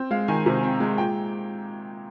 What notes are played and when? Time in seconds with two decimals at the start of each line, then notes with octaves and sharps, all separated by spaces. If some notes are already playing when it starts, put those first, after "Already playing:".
Already playing: C4
0.11 G#3 F5
0.28 D#3 G#5
0.46 C3
0.63 C4
0.80 G#3
0.98 A#2 G5